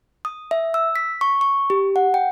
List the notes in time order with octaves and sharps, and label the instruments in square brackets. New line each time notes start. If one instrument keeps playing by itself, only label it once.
[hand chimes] D#6
E5
E6
B6
C#6
C#6
G4
F#5
G5